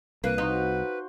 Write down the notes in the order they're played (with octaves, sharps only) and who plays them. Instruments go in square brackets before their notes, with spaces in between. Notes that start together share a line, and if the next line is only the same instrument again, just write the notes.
[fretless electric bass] C2 [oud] A#3 [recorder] B4
[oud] D#4 [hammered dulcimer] F#4 C5 F#5